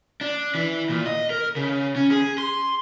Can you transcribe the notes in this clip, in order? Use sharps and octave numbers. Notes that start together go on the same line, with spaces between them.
D4
E3
A#2
D#5
A#4
C#3
C#4
G#4
C6